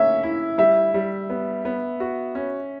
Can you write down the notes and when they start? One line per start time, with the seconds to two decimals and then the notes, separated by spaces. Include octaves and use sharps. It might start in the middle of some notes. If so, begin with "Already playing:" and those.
Already playing: A#3 C#4 E5
0.23 E4
0.58 G3 E5
0.94 G3
1.30 B3
1.65 B3
2.00 F#4
2.35 C#4